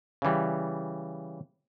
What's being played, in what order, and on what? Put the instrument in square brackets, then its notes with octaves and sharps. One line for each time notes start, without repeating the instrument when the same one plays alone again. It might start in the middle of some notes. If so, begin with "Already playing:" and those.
[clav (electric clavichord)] C#3 E3 G3